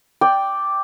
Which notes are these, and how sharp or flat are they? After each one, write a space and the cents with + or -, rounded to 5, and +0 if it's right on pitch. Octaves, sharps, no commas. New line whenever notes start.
D5 +0 G5 +0